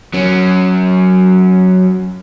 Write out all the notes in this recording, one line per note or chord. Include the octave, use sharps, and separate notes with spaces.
F#3 C#4